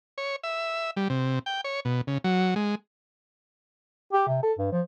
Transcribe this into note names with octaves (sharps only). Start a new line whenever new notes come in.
C#5
E5
G3
C3
G5
C#5
B2
C#3
F#3
G#3
G4
C3
A4
G2
F3